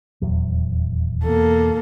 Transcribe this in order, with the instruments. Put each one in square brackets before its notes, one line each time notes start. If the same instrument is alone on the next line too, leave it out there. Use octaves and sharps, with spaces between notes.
[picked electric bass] D#1 E2 F#3
[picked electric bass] E2 B2 [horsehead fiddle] A#3 A4